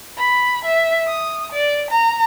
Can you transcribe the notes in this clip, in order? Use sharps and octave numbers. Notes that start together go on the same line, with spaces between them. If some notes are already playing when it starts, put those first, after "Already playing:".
B5
E5
D#6
D5
A#5